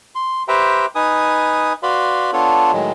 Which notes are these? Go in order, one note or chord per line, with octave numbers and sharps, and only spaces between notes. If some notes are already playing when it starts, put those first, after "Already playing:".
C6
G4 B4 C5 E5 G5 A#5
D#4 B4 G#5 D#6
F#4 B4 D5 F5 B5 C6
B3 D4 F4 A4 C#5
A2 D#3 F#3 G#3